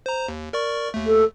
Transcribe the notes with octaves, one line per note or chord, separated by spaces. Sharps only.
C5 A#5
D#2
A#4 D5 C#6
D#2 A3
A4